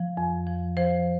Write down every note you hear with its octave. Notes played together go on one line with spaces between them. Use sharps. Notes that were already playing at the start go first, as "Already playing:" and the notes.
Already playing: F3
F2
F3
F3 C5